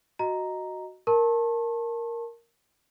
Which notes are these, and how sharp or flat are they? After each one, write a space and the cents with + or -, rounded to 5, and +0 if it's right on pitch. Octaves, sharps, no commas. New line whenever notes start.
F#4 +0 D#5 +0 A#5 +0
A#4 +0 A5 +0 C#6 -40